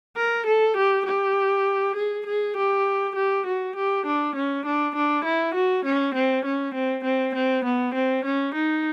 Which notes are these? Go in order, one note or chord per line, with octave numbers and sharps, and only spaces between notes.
A#4
A4
G4
G4
G#4
G#4
G4
G4
F#4
G4
D4
C#4
D4
D4
E4
F#4
C#4
C4
C#4
C4
C4
C4
B3
C4
C#4
D#4